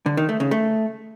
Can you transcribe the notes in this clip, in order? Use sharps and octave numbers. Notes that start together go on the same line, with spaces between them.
D3
D#3
A3
C#3
A3